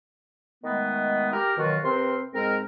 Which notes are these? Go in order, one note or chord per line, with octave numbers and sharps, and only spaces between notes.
D#3 G#3 A3 B3
G4 A#4
B2 D#3 E3 F#3 F4 F#4
C3 C4 A#4 B4 C6
G#2 G#3 C4 A#4